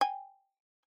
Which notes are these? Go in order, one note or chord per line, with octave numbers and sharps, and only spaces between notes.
G5 G#5